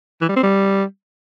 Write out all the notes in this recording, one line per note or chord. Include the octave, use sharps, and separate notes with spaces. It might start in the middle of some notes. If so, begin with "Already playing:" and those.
E3
G3
C4
G3